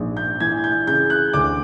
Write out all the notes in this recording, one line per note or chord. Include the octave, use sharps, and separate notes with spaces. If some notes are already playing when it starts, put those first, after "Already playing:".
Already playing: A#1 G#2
G6
E3 G#6
G6
C#3 G6
F#6
D2 D6